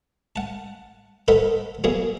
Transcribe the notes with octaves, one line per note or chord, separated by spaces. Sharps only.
F#5 A5
A4 A#4 C5 D#5 F#5 B5
B2 F#3 A#3 B3 G#4